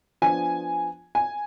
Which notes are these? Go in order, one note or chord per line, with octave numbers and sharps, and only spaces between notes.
F3 B3 D4 G#5
G#5